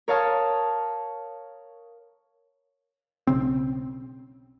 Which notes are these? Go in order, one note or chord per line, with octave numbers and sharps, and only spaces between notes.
A#4 C#5 F5 A5 D#6
B1 C#3 C4